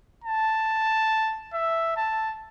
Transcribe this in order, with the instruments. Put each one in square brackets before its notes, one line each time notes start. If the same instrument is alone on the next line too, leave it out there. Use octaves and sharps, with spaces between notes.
[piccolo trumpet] A5
E5
A5